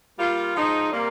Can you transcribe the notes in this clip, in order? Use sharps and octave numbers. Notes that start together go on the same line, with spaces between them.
G3 A#3 F4
F3 G#3 D#4
C3 G3 A#3